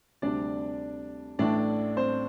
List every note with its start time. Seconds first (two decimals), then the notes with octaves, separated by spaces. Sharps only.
0.22 D2 C3 G3 D4 D5
1.39 A1 A2 A3 D4 D5
1.96 C4 C5